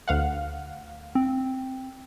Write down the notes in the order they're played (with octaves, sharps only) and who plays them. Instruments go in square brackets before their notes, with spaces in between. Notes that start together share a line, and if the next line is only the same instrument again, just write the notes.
[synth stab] D2 F5 F#5
[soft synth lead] C4